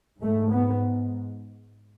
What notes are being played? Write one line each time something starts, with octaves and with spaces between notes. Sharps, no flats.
G#2 A3
B3